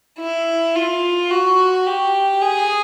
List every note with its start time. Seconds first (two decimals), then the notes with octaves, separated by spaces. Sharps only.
0.19 E4
0.75 F4
1.30 F#4
1.87 G4
2.41 G#4